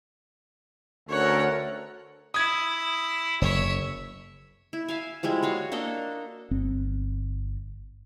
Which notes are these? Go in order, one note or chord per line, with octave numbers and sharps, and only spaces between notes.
D2 C#4 A4 A#4 C#5 F#5
E4 D#6 G#6
F#1 C#5 E5
E4
E5 F5 G#5
F3 G3 G#3 E4
F#4 C#5 F5
A#3 D4 A4 D#5
G1 C4